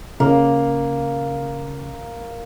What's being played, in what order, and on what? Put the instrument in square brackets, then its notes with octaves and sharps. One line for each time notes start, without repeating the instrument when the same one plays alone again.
[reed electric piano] C#3 [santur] A#3